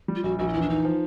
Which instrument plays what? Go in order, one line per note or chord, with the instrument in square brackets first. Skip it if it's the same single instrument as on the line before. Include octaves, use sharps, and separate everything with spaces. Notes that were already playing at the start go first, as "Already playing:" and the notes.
[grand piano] G3
[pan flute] F4
[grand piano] A#1 [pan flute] F#4
[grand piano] A#1 [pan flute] F#4
[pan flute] F4
[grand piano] E2 [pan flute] E4
[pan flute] D4
[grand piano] E2 [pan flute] D#4
[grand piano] F3